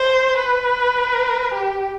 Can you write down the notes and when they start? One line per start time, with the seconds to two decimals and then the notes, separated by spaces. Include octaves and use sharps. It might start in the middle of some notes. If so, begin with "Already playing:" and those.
Already playing: C5
0.38 B4
1.55 G4